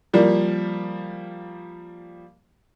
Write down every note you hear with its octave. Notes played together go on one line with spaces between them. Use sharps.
F3 G3 A#3